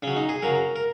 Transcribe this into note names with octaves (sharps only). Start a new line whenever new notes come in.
C#3 F#3 C#4
D#4
G#4
C#3 F#3 A#4
A#4